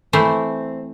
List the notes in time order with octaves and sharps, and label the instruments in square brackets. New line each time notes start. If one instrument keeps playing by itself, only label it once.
[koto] E3 A3 C5 [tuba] C4